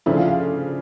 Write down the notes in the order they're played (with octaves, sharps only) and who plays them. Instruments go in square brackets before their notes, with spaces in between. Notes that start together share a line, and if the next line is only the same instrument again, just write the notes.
[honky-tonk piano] C#3 F3 A3 D4 [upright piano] E4 E5
[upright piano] F4 F5
F4 F5